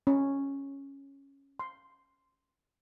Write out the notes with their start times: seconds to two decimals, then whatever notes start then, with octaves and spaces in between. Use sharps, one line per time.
0.07 C#4
1.59 C6